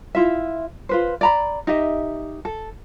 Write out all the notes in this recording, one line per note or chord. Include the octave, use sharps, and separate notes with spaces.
E4 F4 E5
F4 B4 C5
D5 A#5 B5
D#4 G4 D#5 E5
A4